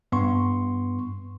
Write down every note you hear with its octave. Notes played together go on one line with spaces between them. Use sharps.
G2 B3 C6 C#6